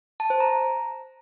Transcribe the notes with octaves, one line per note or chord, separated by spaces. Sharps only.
A5
C5
A#5